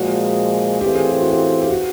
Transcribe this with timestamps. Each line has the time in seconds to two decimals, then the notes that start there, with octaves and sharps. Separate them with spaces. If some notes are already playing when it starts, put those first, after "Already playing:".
Already playing: A#2 F3 G#3 F#4
0.81 A2 E3 A3 C4 F4 G4
0.95 G#4
1.10 G4
1.21 F#4
1.31 G4
1.62 G4
1.70 F#4